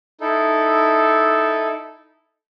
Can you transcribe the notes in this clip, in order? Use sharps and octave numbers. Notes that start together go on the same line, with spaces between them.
D#4 E4 A4